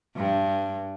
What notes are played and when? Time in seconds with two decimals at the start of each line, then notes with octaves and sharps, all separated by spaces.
0.16 G2